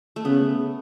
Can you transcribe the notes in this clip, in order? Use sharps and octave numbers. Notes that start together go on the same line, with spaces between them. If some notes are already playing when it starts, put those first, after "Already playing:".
A3
C#3 B3